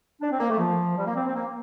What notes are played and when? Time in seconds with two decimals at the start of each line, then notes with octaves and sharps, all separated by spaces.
0.22 D4
0.31 C4
0.39 A#3
0.50 A3
0.59 F3
0.97 G3
1.06 A#3
1.15 C4
1.26 C4
1.35 A#3